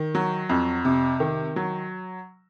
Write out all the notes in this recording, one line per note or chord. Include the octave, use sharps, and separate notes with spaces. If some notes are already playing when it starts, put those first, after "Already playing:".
Already playing: D#3
F#3
F2
C3
D#3
F#3